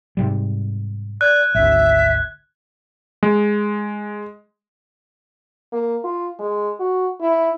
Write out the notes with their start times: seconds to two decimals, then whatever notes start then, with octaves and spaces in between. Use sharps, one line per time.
0.17 G#2 C3 G3
1.21 D5 F#6 G#6
1.55 G#1 D2 E5
3.23 G#3
5.73 A#3
6.04 F4
6.39 G#3
6.79 F#4
7.21 E4